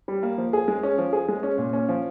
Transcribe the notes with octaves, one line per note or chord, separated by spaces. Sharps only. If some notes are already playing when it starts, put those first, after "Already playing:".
G3
A#3
F3
G#4
G#3
C#4
F3
G#4
G#3
C#4
A#2
C#4
F3